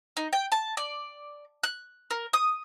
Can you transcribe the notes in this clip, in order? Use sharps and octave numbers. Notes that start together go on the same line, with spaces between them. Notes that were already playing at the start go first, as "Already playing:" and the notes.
D#4
G5
A5
D5
F#6
A#4
D#6